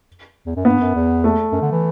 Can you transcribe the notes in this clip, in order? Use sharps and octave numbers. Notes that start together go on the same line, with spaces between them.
E2
F#2
G2 B3
F#2
E2
A3
F#2
D3
E3